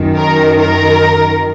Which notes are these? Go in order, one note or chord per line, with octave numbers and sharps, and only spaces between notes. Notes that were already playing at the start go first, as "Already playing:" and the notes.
Already playing: F#2 D#3
A#4
A#4